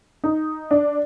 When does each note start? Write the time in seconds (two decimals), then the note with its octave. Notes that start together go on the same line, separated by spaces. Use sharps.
0.24 D#4
0.71 D4